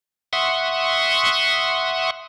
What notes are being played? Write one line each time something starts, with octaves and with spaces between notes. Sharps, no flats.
E5 F#5 C6 C#6 D#6